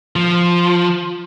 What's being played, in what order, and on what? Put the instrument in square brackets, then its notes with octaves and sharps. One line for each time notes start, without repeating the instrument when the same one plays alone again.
[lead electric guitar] F3